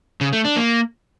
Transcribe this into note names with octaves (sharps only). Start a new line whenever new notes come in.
C#3
A3
D4
A#3